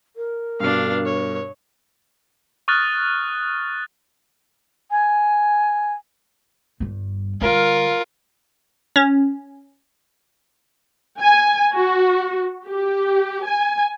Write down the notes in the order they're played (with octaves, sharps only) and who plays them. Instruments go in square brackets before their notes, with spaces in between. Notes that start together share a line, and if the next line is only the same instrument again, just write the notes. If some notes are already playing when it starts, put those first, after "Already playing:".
[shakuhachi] A#4
[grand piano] G2 B2 [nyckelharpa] D4 F5
[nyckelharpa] C#5
[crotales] C#6 D#6 F6 F#6 A6
[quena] G#5
[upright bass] G1 G2
[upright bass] D3 G3 [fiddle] F4 A#4
[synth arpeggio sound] C#4
[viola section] G#5
F#4
G4
G#5